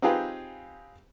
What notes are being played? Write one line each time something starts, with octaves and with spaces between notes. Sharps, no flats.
C4 D#4 F4 G4 G#4 B4